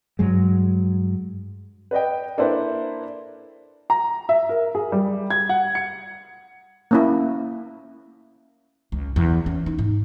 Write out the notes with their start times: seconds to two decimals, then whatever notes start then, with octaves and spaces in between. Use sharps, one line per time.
0.19 G2 F#3 G#3
1.91 B4 D5 D#5 G5
2.38 A#3 D4 E4 A4 B4 C5
3.90 A#5
4.29 E5
4.49 A#4
4.75 G#4
4.92 G3
5.30 G#6
5.49 F#5
5.75 C#7
6.91 A#3 C#4 E4
8.92 C#2
9.16 E2
9.46 C#4
9.66 D#4
9.79 G#2